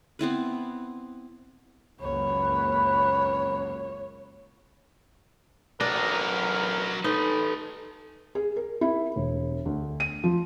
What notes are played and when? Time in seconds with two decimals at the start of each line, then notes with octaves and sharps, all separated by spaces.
0.19 B3 C4 E4 B4
2.00 C#2 F#2 A#3 B4 C#5
5.81 A1 F#3 D4 A#4 B4 D#5
7.04 D#4 A4 B4
8.35 G#4
8.56 A#4
8.81 E4
9.16 E1
9.65 D2
10.00 D#7
10.24 F3